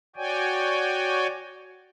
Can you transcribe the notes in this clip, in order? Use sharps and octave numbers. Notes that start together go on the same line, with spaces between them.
F#4 C#5 D5 G5 G#5